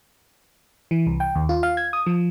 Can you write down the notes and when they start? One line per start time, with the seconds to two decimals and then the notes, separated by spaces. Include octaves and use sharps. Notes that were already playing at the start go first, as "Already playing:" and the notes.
0.91 E3
1.06 C2
1.20 G5
1.35 D#2
1.49 F4
1.63 F5
1.77 G#6
1.93 D#6
2.06 F3